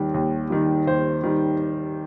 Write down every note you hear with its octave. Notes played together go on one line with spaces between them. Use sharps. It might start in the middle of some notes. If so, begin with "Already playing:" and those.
Already playing: D#2 D#3 G3
D#2
D#3 G3
D#2 C5
D#3 G3